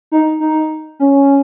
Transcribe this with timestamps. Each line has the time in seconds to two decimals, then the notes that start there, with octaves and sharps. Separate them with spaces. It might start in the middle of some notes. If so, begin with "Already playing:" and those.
0.12 D#4
0.40 D#4
1.00 C#4